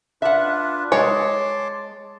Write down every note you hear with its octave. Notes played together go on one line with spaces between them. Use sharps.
D4 F4 B4 E5 F#5
G#3 C#5 A5 C6 D6